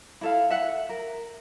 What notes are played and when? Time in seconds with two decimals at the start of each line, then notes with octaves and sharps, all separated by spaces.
0.21 E4 A4 F5
0.50 E5 F#5
0.89 A#4